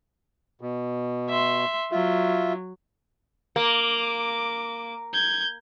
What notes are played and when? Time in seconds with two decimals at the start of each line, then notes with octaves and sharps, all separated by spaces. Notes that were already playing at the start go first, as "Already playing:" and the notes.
0.61 B2
1.29 E5 C6
1.92 F#3 F4 E5
3.56 A#3 D6
5.13 G6 G#6